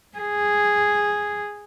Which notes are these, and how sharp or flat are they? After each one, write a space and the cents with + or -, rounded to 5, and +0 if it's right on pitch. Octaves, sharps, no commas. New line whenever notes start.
G#4 -5